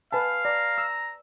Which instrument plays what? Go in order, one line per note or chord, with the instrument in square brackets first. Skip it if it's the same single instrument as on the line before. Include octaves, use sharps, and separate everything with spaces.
[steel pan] B4 G#5 A5 [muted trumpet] F5
[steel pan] D5 [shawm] A#5
[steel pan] E6